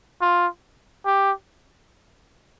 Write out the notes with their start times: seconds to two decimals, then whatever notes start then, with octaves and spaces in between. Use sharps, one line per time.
0.21 F4
1.06 G4